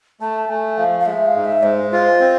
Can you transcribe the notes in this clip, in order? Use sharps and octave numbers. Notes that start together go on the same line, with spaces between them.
A3 A5
A3 G#5
F3 F5
F5
G#3 E5
F5
G#2
E5
G#3 C5
F4 C5
C4